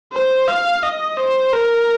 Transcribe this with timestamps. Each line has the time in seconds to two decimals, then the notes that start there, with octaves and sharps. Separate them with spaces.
0.13 C5
0.47 F5
0.83 D#5
1.17 C5
1.53 A#4